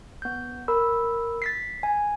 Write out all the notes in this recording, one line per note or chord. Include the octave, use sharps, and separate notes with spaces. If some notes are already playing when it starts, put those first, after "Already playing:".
B3 G6
A#4 B5 E6
A6 B6 C7
G#5